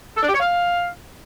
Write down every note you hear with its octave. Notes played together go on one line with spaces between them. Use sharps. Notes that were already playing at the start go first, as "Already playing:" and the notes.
A4
D4
G4
C#5
F5